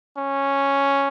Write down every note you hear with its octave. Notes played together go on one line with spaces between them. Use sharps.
C#4